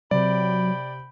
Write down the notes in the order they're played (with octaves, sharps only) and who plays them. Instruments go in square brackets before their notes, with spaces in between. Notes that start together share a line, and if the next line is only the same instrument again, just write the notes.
[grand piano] C3 [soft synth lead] F#3 [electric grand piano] D5 [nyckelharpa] G5 B5